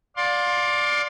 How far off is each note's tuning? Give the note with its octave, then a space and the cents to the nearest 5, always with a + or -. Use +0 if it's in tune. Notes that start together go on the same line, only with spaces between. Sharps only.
D5 +0 F5 +35 C6 +20